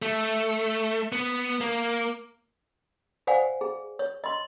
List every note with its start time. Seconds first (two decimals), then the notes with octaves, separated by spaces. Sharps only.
0.02 A3
1.12 B3
1.61 A#3
3.27 C5 D5 F5 F#5 G#5
3.61 G#4
3.99 C#5
4.24 D#5 C6